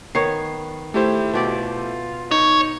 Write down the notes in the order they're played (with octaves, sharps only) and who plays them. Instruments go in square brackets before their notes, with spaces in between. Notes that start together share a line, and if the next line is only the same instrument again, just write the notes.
[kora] D#3 B3 C#5 [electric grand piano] C7
[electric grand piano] A3 E4 C5 [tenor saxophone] G4
[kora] B2 G4 D5 [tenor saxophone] F4
[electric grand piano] D#4 [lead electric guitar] C#5